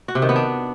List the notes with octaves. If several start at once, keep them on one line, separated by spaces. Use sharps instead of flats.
F#4
C3
D#3
B3
D4